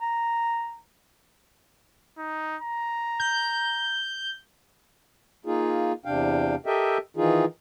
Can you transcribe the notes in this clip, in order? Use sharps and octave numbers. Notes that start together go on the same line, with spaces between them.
A#5
D#4
A#5
G6
A#3 D#4 F4 G#4
E2 C3 D4 F5 G5
G4 A4 A#4 D#5 E5 G5
D#3 E3 D#4 F4 G#4